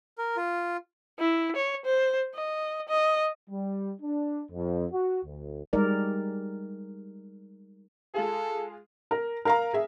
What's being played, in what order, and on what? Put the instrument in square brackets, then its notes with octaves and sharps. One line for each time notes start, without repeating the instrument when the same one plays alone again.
[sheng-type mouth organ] A#4
F4
[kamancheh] E4
C#5
C5
D#5
D#5
[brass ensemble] G3
D4
F2
F#4
D2
[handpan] G3 G#3 D#4 A#4 D5
[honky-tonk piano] G#3 F4 G#4 [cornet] A4
[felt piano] A#4
A#4 F5 A#5
G#4 E5